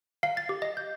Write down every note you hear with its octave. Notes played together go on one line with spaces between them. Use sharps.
F5
A6
G4
D#5
G6